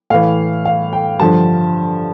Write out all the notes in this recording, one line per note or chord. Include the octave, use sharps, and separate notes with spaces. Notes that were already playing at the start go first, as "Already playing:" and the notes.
A2 E3 F5
F5
G5
G2 D3 F3 A5